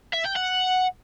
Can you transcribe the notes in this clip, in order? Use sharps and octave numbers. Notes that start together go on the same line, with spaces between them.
E5
G5
F#5